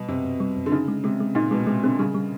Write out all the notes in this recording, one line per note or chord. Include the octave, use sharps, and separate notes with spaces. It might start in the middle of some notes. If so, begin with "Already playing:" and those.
Already playing: B2 G3
F#2 C3
F#2
G3
F#2
D3
C#3 D#4
G#3
C3 G#3
G#3
A#2 D#4
B2 G#3
C3 G#3
D3 C4
C#3 G3
G3